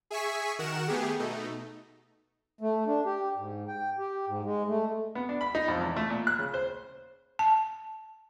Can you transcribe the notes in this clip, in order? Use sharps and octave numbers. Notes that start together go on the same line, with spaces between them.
G#4 E5 G#5 C#6 B6
D#3 F#4 A#4 F#5 E7
A3 B3 G4 G#4
B2 A3 D#4
A3
D4
G4
G#2
G5
G4
G#2
G#3
A3
B3
D4
B5
D#4
F2
E2
A3
A#2
F#6
C#3
C5
A5